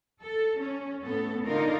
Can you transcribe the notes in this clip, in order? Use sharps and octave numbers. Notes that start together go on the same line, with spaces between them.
A4
C#4
A2 B3 A4
D3 D#4 F4 A#4